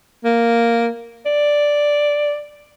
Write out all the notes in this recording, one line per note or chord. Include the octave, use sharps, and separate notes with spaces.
A#3
D5